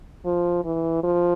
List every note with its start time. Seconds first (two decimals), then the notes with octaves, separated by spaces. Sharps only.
0.26 F3
0.65 E3
1.03 F3